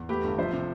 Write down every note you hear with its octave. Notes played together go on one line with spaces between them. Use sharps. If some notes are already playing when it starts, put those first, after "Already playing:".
Already playing: E2
A3 G4 B4
G1
F3 C5 E5
C3